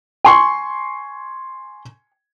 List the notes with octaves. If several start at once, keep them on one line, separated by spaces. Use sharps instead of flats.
G#5 C6 C#6